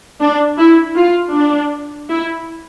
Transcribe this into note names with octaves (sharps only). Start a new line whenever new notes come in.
D4
E4
F4
D4
E4